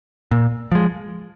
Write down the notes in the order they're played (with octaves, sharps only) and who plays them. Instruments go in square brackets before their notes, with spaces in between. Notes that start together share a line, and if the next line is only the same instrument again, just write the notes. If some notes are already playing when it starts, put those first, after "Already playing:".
[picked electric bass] A#2
F3 G#3